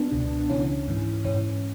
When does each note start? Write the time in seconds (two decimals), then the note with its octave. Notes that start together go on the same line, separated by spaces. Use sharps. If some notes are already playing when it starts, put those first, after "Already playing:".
Already playing: B3 D4
0.12 C#2 B2
0.50 C#2 C#3 E3 C#4
0.88 G#2 E3
1.25 G#2 E3 C#4